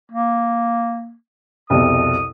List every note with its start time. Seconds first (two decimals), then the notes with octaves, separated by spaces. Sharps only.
0.11 A#3
1.70 C2 F2 B2 D#6